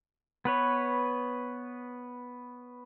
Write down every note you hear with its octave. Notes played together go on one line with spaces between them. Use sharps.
B3 B4 C#5